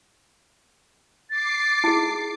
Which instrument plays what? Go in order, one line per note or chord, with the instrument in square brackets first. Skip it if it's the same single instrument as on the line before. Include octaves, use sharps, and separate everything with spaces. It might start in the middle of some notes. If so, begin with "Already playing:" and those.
[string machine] D6 C7 [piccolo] A6
[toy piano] E4 G#4